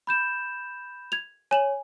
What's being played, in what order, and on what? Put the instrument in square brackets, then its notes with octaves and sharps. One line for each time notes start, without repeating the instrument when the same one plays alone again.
[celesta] B5 G6 E7
[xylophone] G#6 F7
[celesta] C#5 [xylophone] G#5 E7 F#7